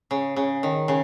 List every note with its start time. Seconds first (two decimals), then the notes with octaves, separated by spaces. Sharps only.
0.11 C#3
0.36 C#3
0.63 D#3
0.88 C#3